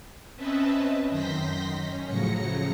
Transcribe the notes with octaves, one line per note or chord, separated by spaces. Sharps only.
C4 C#4 B4 D#5 E5 A5
F#2 D#3 C6 G6 A#6 B6
C#4
A2 C#3 F3 F#3 A#6 C#7